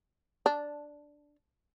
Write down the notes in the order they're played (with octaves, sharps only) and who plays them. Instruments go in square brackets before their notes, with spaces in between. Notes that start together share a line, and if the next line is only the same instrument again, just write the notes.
[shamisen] D4